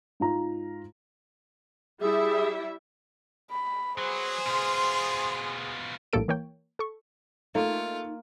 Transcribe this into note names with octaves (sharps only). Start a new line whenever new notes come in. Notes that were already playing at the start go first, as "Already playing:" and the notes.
G#2 F4 A#5
G3 E4 G#4 E5
B5
F#3 B3 G#4 C5
B2 F4 C6
A#1 A2 G3 A#3 A4 D7
E3 A#3 C#5 G5
A4 C#6
A3 A#3 D#4 F4